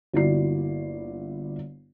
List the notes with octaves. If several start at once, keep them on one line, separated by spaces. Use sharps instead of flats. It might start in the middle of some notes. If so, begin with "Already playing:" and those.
G1 A#3 E4 F#4 D5 C7